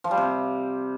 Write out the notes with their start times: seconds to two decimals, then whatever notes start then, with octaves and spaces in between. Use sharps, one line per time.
0.04 F3
0.11 G3
0.18 C3